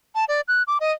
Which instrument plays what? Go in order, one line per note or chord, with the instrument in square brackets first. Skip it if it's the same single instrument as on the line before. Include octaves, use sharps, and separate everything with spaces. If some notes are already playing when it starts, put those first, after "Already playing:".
[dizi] A5
D5
F#6
D6
D#5